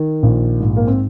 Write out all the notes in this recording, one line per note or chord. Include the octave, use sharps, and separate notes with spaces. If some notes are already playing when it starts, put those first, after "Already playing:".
Already playing: D#3
A#1
G#2
A#3
C4